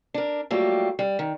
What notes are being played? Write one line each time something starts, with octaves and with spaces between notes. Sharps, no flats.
D4 A#4
F#3 G3 A3 A#3 F4 G4
G3
D#3